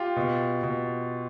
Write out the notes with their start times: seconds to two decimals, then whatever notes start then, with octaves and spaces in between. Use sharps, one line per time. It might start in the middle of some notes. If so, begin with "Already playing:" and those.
Already playing: F4 G4
0.16 B2
0.63 B2